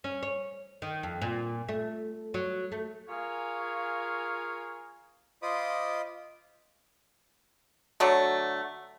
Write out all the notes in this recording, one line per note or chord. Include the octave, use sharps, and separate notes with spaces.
C#4
C#5
D#3
F2
A#2
A3
F#3
A3
F4 G#4 A#4 C#5 F5
F4 C5 D#5 B5 D6 D#6
D3 F#3 A3